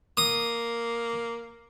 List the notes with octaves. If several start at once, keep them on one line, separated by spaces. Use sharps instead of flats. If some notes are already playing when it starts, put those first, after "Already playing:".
A#3 D#6